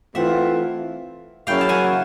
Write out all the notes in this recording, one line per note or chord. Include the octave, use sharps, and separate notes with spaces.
E3 A3 C4 F4 E5 F#5
C#3 F#3 A#3 C#4 E4 F5 G5
A5
F#5 G#5